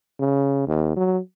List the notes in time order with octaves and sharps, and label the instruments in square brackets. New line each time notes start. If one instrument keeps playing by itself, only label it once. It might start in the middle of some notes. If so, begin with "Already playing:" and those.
[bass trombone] C#3
D#2
F#3